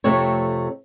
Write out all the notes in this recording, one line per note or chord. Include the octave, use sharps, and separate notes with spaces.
F2 C3 A3 C4 C#5